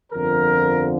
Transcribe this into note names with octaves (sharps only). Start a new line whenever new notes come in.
G1 F2 D3 F3 A#4